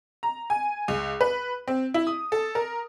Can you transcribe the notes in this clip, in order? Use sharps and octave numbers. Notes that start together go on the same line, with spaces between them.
A#5
G#5
C#2
B4
C4
E4
D#6
A4
A#4